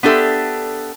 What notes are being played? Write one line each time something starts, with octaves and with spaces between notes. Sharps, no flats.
B3 D4 G4 A4 E5